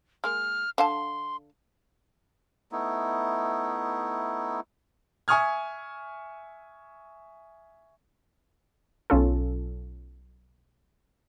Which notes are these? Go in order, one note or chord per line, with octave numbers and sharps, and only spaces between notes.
G#3 A#3 F6
D3 F5 A5 C6
A3 B3 D#4 E4
E5 G#5 C#6 D#6 F6 G#6
B1 C#4 F4 A4